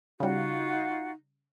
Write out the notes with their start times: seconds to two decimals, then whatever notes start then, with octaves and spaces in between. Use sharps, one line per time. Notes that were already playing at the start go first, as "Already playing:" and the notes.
0.20 C#3 G3 D#4 F4 F#4